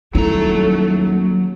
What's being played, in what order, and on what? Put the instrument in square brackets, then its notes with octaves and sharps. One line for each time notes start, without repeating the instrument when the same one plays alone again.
[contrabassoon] D#1 [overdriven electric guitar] F#3 A#5 [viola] A3 [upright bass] E4